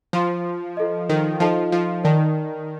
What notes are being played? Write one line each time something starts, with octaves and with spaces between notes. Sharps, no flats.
F3 F4 C5 F5 C6
F4 A4 D#5
D#3
F3 D#4 A4 D#5 A5
F3
D#3 A#4 D5 A5